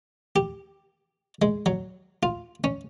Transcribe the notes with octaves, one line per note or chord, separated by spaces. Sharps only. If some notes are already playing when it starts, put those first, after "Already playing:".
G4
G#3
F#3
F4
C#4